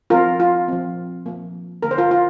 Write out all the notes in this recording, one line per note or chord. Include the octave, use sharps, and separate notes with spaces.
F3 C4 F4 A#4
F4
F3 C4
F3 A#3
D3 A#3 A#4
C5
F4 A#4
F4